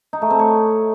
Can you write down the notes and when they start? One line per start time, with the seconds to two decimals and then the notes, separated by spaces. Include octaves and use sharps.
0.13 D#4
0.22 A3
0.30 C4
0.39 C#5